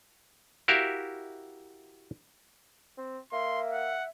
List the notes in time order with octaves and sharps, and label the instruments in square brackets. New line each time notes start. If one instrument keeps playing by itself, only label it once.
[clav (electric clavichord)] E4 F#4 G4 A#4 E5 F5
[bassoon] C4
[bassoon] A#3 [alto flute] E5 [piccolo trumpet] C6
[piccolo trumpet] F#5